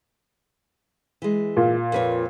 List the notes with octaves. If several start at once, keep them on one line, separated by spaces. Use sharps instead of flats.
E3 G#3
A#2
F2 B4 C#5